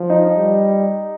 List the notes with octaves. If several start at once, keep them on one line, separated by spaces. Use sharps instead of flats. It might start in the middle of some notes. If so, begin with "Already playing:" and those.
Already playing: F3
D#4
G3